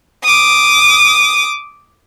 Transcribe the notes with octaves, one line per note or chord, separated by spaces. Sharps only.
D6 D#6